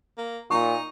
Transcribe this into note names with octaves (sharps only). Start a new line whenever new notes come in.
A#3
A#2 D#4 C#6